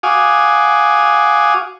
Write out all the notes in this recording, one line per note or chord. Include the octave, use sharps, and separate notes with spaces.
F#4 F5 G#5 D6 D#6